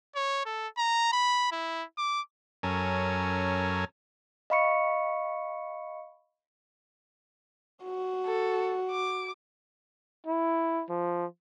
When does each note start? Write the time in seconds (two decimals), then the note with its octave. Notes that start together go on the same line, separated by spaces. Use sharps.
0.16 C#5
0.46 A4
0.77 A#5
1.13 B5
1.52 E4
1.98 D6
2.63 F#2 C#4 A4 A#4 G#5
4.50 D#5 F5 B5 C#6 C#7
7.84 F#4
8.26 A4
8.91 D6
10.27 E4
10.90 F3